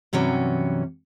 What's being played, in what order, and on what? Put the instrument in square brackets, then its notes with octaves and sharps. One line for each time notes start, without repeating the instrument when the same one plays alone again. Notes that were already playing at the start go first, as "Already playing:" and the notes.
[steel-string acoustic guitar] G2 C3 E3 F#3 C#4